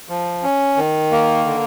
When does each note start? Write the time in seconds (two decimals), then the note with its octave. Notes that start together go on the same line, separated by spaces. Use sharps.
0.09 F3
0.43 C#4
0.77 D#3
1.12 A#3
1.45 D3